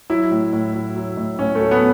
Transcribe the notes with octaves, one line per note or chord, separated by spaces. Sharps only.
F#3 E4
A2
A2
F#3
F#3
A2
A2 C#4
A3
F#3
B3